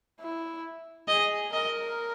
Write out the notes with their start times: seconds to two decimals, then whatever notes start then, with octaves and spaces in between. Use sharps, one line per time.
0.20 E4
1.08 G#4 D#5
1.54 A#4 D#5